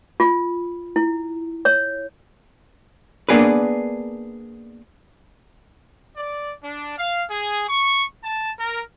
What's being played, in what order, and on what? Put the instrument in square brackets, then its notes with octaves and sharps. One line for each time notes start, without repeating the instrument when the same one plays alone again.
[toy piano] F4
E4
C#5
[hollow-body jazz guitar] A#3 B3 D4 G#4 A#4 B4
[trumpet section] D5
D4
F5
G#4
C#6
A5
A#4